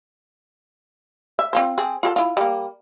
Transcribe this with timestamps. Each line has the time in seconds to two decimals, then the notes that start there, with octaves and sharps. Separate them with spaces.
1.39 E5
1.53 C4 F4 C5
1.78 C4 G#4
2.03 F4 G4 A4
2.16 E4 F4
2.37 G3 A#3